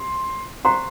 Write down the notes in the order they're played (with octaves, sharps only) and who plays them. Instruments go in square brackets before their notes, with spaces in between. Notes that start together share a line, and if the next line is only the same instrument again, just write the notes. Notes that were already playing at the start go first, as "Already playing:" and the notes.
Already playing: [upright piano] C6
[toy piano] C5 F5 A#5 C#6 [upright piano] C6